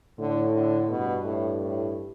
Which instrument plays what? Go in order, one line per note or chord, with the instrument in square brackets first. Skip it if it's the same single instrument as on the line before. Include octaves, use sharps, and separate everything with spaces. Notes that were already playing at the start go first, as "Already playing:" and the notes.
[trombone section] A2 [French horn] D3
[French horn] D3
[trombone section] G2 [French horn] B2
[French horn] A2
A2